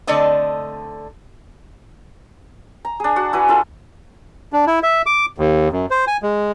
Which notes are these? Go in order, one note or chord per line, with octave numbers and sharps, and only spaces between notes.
D3 A3 C4 D5 D#5 A5
A#5
D4 G#4
F#4 F#5
E4 F#4 B4 G#5
E4 F4 A4
D4
E4
E5
D6
D#2
F#2
C5
G#5
G#3